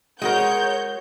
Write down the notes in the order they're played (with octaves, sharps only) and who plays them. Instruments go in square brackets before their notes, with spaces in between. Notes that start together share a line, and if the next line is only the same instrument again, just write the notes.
[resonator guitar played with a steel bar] G#3 F#4 A#4 [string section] C#5 G6